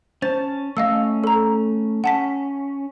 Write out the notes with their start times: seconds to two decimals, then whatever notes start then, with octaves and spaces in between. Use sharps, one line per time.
0.22 C#4 C5 A5 A6
0.77 A3 C#4 D#5 F5 E6
1.24 A4 A#5
2.04 C#4 F#5 A5 B6